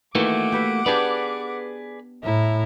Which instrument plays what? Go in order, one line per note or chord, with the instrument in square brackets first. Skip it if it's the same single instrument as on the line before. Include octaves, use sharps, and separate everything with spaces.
[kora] D#3 E3 [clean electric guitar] A3 A#3 F#4 [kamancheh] F#5 D6
[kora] G4 B4 E5
[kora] B3 D4 G4 [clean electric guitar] G#4 B4 D5
[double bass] A2 [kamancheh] E4 A#5